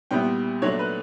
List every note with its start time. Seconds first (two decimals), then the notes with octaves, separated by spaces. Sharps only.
0.11 A#2 G3 B3 E4 G5
0.62 A#2 F#3 A3 D4 C#5
0.79 B4